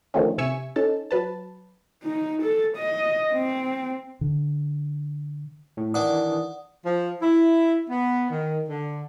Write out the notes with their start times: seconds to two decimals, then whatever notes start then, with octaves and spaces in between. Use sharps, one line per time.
0.14 D3 D#3 F3 A3 C4 C#4
0.38 C3 E5 G#5 C#6 E6
0.76 C#4 D#4 A4 A5
1.11 F#3 B4 A5
2.03 D#4
2.42 A4
2.77 D#5
3.33 C4
4.21 D3
5.77 A2
5.94 D#3 E3 D4 D5 F#5 D#6
6.86 F3
7.22 E4
7.90 B3
8.30 D#3
8.69 D3